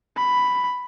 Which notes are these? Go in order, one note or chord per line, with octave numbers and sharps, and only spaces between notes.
B5